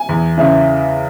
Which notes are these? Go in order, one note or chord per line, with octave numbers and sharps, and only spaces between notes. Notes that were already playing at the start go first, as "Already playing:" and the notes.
Already playing: G#5
E2
C#3 E3